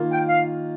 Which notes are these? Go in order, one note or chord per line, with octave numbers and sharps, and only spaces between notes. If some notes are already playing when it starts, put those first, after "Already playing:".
Already playing: D#3 A#3 F4
G5
F5